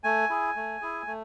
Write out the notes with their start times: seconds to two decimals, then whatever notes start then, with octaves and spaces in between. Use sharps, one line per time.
0.04 A3 G#5
0.30 E4 G#4
0.56 A3
0.81 E4 G#4
1.07 A3